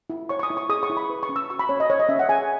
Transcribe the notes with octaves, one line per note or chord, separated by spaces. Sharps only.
E4
C#5 C#6
C#6
D#6
E4
C#6
G#4 D#6
C#6
E4
B5
B4
C#6
C#4
E6
F#4 C#6
B5
C#4 C#5
D#5
C#5
D#5
C#4 E5
F#5
G#4 G#5